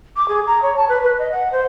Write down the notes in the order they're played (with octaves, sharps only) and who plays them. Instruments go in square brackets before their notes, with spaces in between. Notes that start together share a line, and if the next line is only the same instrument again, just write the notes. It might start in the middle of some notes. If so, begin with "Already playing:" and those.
[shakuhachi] D6
G#4
A#5
C#5
A5
B4
B4
D#5
F#5
C5